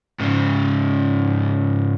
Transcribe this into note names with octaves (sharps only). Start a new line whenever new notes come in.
G#2 C#3